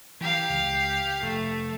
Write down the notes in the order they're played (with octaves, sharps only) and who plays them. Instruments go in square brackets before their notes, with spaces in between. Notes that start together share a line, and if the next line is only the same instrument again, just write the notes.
[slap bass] E3 [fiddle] G4 F5
[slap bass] C#2
[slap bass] F1 [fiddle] A3